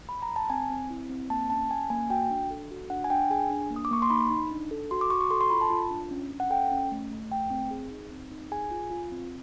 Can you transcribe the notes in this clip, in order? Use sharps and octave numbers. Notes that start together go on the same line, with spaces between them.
B5
A#5
A5
C4 G#5
C4
E4
C4
A#3 A5
C#4 A5
C#4 G#5
A#3 G#5
F#4 G5
D4
A4
F#4
D4 F#5
G#5
D4 G5
G#4 G#5
D4
A#3
D#6
D6
A#3 C#6
C6
D#4 B5
D#4
D4
A4
F#4 C6
D6
F#4 C#6
C#6
A4 C6
C6
F4 B5
A5
F4
D4
C#4
C#4
F#5
A4 G5
C#4
A3
A3
A3 G5
C4
G#4
D#4
C4
D#4
G#4 G#5
F4
F4
C4